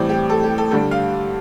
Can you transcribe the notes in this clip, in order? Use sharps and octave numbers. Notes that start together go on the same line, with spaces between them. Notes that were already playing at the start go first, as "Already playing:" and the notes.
Already playing: A2 E3 G3 C4 D5
G4
A4
G4
A4
G2 D3 G3 D4 A4
F5